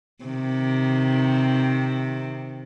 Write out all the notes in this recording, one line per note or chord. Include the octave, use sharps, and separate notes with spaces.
C3 D#3